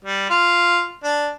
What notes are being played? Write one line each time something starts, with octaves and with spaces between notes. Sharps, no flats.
G3
F4
D4